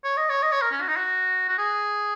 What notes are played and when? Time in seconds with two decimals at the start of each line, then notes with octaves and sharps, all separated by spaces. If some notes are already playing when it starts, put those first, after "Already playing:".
0.04 C#5
0.17 D#5
0.29 C#5
0.43 D#5
0.52 C#5
0.62 A#4
0.71 C#4
0.81 F#4
0.89 D#4
0.97 F#4
1.49 F#4
1.58 G#4